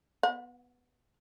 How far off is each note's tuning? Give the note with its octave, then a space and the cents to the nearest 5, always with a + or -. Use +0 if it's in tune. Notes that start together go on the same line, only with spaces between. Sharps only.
B3 +0 F#5 -40